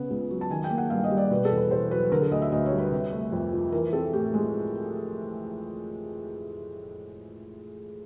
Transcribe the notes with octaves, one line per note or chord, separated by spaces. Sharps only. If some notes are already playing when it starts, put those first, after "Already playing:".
Already playing: C#3 B3
C#2
F#3
A5
D#3 G#5
G5
A#3
F#5
G2 F5
D#5
G3
D5
B2 B4
A4
E2
B4
E2 C5
F#3 B4
D3 A#4
A4
D2 D#5
E5
D2 D#5
C#5
G3
B4
C3
A3
F2
F3
E3 A#4
C4 A4
A2 G4
G#3